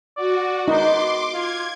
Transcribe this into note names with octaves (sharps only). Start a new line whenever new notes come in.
F#4 D5
B3 D#4 C6 D6
F4 G#6